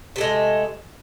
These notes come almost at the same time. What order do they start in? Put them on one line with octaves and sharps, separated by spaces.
C3 A3 G#3